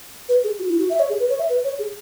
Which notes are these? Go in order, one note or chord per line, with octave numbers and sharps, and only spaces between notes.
B4
G#4
F#4
E4
F#4
E5
C#5
G#4
B4
C#5
E5
B4
C#5
G#4